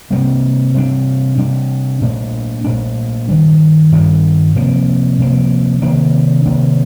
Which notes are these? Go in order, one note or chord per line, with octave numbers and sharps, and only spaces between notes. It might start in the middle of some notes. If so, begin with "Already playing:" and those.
C3 G3 A#3
C3 G3 D4
C3 G3 D4
A#2 A3 D4
A#2 A3 D4
G2 D#3 G3
G2 D#3 G3
C3 F3 A#3
C3 F3 A#3
C3 D#3 A#3 D4
C3 D#3 A#3 D4